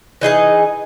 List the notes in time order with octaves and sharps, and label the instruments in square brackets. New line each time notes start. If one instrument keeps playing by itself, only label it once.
[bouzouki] E3 D#4 G#4 D#5